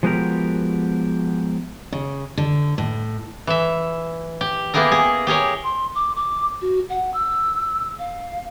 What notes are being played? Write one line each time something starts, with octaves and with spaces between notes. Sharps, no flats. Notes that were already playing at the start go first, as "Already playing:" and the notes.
F3 G#3 B3 F#4 G4 A#4
C#3
D3
A2
E3 E5
G4
A#3 B3 E4 G4 G#4 A#4
G#4
G4 G#4 A#4 C#5
C6
D6
D6
F#4
F#5
E6
F5